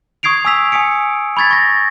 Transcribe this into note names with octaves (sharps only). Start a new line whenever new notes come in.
C#6 D#6 G#6 C7 D7 F7
G#5 D#6 E6 B6 F7
G#5 D#6 B6 C#7 D7
B5 C#6 G#6 A6 B6
C#6 A#6